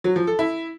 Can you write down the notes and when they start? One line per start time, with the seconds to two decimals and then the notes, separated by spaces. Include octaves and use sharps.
0.04 F#3
0.16 F3
0.27 A4
0.39 E4